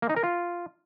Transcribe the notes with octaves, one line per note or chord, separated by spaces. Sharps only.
A#3
D#4
A#4
F4